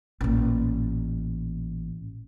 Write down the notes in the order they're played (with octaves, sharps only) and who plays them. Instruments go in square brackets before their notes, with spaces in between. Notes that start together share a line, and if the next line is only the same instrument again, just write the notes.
[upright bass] A1 A#2